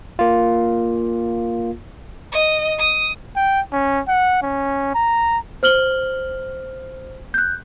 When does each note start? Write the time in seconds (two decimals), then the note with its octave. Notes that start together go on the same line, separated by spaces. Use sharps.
0.19 A#3 F4
2.32 D#5
2.79 D#6
3.36 G5
3.72 C#4
4.08 F#5
4.42 C#4
4.95 A#5
5.63 C5 F6 F#7 G7
7.34 F#6 G6